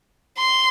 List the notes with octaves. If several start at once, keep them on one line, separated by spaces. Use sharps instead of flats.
C6